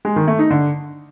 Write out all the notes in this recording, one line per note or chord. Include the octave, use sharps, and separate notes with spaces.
G#3
D#3
A3
D#4
D3